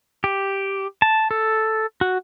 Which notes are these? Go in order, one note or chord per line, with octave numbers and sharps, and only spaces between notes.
G4
A5
A4
F#4